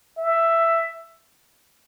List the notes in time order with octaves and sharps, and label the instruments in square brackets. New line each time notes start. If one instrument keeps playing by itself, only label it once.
[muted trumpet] E5